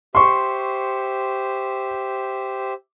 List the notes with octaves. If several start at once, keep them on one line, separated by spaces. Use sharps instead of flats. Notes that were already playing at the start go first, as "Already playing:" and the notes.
G4 C5 E5 C6 C#6